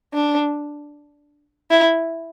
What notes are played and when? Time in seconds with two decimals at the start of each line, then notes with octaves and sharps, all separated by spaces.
0.13 D4
1.71 E4